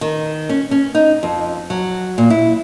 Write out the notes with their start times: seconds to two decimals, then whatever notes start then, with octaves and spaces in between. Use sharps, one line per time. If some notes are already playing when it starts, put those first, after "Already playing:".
0.01 D#3
0.49 C#4
0.71 C#4
0.95 D#4
1.23 F2
1.70 F#3
2.18 A#2
2.30 E4